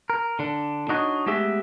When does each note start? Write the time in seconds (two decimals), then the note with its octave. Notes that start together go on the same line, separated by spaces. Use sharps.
0.10 A#4
0.39 D3 D4
0.88 D4 D#4 F#4 A#4 C#5 D#5
1.26 G#3 A3 B3 G4 G#4 E5